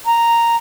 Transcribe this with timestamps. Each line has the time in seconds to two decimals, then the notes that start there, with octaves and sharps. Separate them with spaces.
0.07 A#5